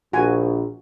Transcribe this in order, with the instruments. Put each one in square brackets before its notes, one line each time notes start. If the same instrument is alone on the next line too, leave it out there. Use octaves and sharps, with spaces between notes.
[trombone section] A#1 [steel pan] F#4 G#5